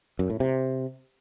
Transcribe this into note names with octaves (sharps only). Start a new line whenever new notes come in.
F#2
A2
C3